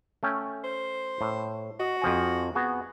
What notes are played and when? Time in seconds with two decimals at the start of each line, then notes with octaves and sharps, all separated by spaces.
0.23 A3 C#4 G5
0.64 C5
1.21 A2
1.80 F#4 D#5
2.02 F2 F3 G#5
2.55 B3 F#4 G#4